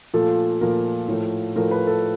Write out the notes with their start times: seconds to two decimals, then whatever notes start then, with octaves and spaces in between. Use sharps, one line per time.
0.14 A#2 F3 A3 A4
0.61 A#2 F3 A3 A#4
1.08 A2 F3 A3
1.56 A2 F3 A3 A#4
1.71 B4
1.87 A4